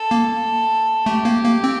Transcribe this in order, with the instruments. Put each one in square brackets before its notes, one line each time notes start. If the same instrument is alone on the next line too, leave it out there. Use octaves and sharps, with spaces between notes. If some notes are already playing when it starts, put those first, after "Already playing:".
Already playing: [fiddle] A4
[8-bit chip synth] A#3
[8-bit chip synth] A3 [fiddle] G4
[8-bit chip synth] A#3
A#3
C4